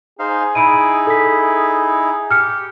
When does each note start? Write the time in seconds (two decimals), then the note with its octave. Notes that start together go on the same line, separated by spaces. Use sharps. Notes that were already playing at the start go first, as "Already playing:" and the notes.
0.19 D#4 G#4 C5 F5
0.55 D#4 E4 B5 D7 D#7
1.07 A4 B6
2.31 G4 F6 C#7